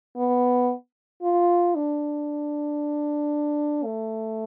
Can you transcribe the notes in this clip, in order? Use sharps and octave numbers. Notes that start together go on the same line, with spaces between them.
B3
F4
D4
A3